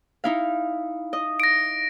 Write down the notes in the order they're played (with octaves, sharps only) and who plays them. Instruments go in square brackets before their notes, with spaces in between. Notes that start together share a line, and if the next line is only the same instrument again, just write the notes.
[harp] D#4 E4 F5
D#5
[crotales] A#6 D7